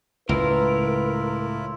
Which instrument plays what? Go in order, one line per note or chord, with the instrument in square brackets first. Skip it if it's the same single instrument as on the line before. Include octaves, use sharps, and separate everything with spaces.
[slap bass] C#2 [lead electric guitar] A2 A#4 [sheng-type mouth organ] E4 F4 [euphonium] B4